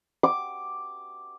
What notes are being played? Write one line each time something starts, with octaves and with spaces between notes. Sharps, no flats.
D6